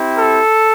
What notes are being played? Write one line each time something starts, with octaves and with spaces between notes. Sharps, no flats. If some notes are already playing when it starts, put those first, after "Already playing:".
Already playing: C4 E4 G4
A4